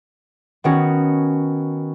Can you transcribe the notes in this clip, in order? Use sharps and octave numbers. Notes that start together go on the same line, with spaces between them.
D#3 B3 C#4 F#4